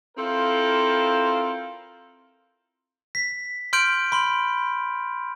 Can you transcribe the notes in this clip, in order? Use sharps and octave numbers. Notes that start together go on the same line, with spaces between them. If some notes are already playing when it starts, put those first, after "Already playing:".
C4 E4 F4 A4 A#4 C5
B6
C6 F6 G6 D7 F#7
B5 C6 F#7